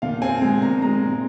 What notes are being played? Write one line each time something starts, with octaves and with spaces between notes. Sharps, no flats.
A#2 F5
C4 G#5
G#3 G#5
A#2 A#5
G#3 A#5
A#2